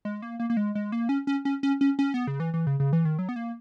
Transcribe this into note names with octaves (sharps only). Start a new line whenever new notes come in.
G#3
A#3
A#3
A#3
G#3
G#3
A#3
C#4
C#4
C#4
C#4
C#4
C#4
B3
C#3
E3
E3
C#3
C#3
E3
D#3
F#3
B3
A#3